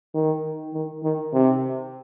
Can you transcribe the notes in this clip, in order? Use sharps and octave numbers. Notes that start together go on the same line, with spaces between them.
D#3
D#3
D#3
C3